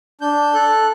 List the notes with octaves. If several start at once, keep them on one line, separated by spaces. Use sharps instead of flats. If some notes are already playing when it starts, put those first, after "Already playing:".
D4 G6
A4 F#6